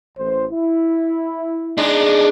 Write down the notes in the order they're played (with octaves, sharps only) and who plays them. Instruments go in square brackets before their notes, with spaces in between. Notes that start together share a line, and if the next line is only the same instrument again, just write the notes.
[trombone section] A1 C5
E4
[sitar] G#3 [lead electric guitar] D4 D#4